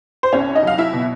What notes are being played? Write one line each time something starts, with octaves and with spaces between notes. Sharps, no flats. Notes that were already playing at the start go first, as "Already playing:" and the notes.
C5
C2 C#4 C#5
D#4 D#5
F#3 F5
E4 E5
B2